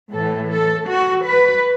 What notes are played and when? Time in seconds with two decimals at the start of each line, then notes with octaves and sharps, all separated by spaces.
0.12 A2 E3 A4
0.50 A4
0.88 F#4
1.26 B4